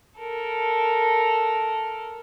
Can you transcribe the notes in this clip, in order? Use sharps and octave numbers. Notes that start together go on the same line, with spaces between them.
A4 A#4